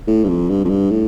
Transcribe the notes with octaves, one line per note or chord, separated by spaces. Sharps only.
A2
G2
F2
G2
F2
G2
A2